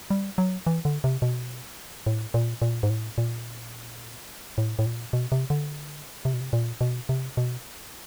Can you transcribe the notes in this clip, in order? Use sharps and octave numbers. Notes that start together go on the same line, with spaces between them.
G3
F#3
E3
D3
C3
B2
A2
A#2
A#2
G#2
A2
A#2
A2
A2
A#2
B2
C3
D3
C3
B2
C3
A#2
B2
C3
B2